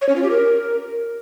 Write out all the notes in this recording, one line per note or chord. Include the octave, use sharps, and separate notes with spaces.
C#5
C#4
F4
G4
A#4